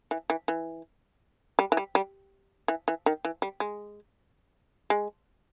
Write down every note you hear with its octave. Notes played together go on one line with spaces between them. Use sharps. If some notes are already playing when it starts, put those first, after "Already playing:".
E3
E3
E3
G3
E3
G3
G3
E3
E3
D#3
E3
G3
G#3
G#3